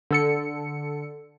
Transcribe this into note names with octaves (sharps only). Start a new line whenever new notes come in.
D3 A4 C#7